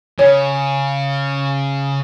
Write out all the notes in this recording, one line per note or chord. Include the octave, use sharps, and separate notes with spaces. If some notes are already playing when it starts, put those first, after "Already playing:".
C#3 C#5